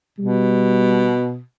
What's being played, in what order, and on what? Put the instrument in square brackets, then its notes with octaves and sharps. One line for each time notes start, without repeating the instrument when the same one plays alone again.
[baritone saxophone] B2 [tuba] G3